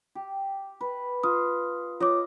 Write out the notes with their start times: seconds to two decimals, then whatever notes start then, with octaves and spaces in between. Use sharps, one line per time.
0.15 G4
0.81 B4
1.23 F4 D#6
2.00 F4 C#5 D#5 D6